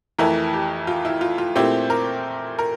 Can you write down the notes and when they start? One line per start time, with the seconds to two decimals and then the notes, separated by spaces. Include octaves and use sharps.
0.18 F2 E3 A3 E4 A#4
0.53 G4
0.87 F4
1.05 E4
1.21 F4
1.38 F4
1.56 A#2 A3 C4 E4 G4
1.90 A#4
2.59 A#4